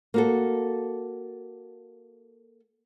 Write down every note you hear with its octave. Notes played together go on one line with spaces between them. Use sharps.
A#3 F#4 A4